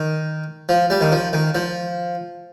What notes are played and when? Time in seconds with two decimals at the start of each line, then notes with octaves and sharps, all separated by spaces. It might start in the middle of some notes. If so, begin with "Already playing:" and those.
Already playing: D#3
0.69 F3
0.90 G3
1.01 D#3
1.12 F3
1.33 D#3
1.55 F3